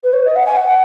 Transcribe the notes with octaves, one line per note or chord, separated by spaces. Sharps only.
B4
C#5
D#5
F#5
G#5
F#5
F#5